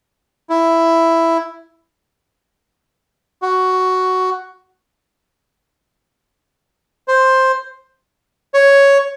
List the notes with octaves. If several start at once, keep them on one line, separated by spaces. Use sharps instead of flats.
E4
F#4
C5
C#5